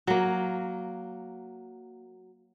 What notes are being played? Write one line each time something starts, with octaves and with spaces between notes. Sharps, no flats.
F#3 A#3